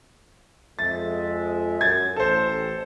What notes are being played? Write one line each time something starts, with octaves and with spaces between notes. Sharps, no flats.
F2 G#3 E5 A6
F#2 G#6 A6
A1 A4 C5